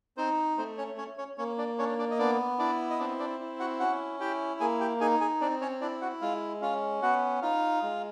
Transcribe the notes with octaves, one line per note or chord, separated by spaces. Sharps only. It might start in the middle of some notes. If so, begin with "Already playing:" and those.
C4 D#4 C5
A3 C4 C5
C#4 C#5
C#4 C#5
C#4 C#5
A#3 C#4 C#5
D4 D5
C#4 D4 C#5
D4 D5
D#5
B3 D4 D5
D4 E4 D5
D#5
C4 D4 D5
D4 D5
E4
F#4 F#5
C#4 F#4 F#5
E4 G4 G5
A#3 G#4 G#5
G4 G5
D#4 G#4 G#5
G#4 G#5
C4 D4 D5
C#4 C#5
D4 E4 D5
F#4 F#5
G#3 F4 F5
C#4 F4 F5
B3 F#4 F#5
D#4 F4 F5
G#3